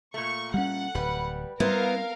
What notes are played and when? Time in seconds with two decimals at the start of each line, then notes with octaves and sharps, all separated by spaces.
0.14 A#2 A3 C#6
0.54 G3 G#3 C#4 F#5
0.95 D1 G3 B4
1.60 G3 B3 E4 A#4 C5 F5